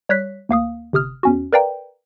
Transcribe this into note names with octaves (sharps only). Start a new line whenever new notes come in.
G3 C#5 F#6 B6
D2 A#3 F5 D#6
G1 C3 D#6 F6
E2 C#4 F#4
A#4 B4 D5 F5 G5 A#5